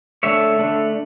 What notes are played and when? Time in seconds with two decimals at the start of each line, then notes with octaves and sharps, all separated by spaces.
0.23 D3 A3 D4 C#5 E5
0.59 D3 A3 D4